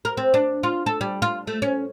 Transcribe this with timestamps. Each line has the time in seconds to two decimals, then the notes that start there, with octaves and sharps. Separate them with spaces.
0.05 A#4
0.17 C4
0.34 D4
0.63 F4
0.86 A4
1.01 G3
1.22 F4
1.47 A3
1.62 C#4